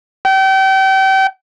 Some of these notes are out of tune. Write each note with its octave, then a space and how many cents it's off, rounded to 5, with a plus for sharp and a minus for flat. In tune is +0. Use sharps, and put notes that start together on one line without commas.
G5 -35